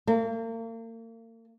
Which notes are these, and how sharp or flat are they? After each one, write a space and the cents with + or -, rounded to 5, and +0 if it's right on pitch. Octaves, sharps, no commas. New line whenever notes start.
A#3 -40